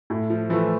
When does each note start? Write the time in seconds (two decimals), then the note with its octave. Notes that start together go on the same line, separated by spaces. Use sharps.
0.10 A2
0.30 F3
0.49 E3 F3 A3